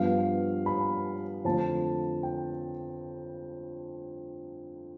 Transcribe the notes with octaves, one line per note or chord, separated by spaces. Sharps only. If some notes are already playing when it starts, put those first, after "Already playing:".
Already playing: G2 F3 B3 F5
B5
F2 D3 A3 A5
G5